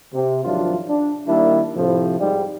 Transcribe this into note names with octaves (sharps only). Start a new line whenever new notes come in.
C3
G#1 F3 F#3 D4 E4 F4
D4
D#3 G3 A#3 D4 E4
A2 C3 F3
G#2 G3